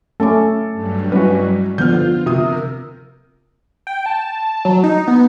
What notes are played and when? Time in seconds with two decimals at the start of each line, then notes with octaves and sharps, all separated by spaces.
0.20 A3 C#4 A4 D6
0.73 G2 F#3 G3
1.12 G#3 C#4 E4 F#4 B4
1.78 D3 F3 B3 F4 F6 G6
2.26 C3 A#4 D#6
3.87 G5
4.06 A5
4.65 F#3
4.84 D#4
5.07 B3